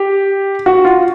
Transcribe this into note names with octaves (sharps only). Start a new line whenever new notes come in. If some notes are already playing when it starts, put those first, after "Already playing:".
Already playing: G4
F#4
F4